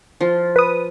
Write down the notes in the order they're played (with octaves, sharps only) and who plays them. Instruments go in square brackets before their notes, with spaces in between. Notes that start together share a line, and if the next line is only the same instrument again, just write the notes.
[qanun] F3 F4
[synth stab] B4 D#6